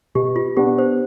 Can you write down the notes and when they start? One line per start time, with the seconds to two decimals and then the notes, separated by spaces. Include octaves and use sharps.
0.15 B2 G4
0.36 F4
0.57 B3 D4 G4
0.78 C5